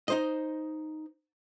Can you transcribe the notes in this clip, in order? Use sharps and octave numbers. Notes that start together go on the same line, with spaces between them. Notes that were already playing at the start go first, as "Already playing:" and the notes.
D#4 C5 D#5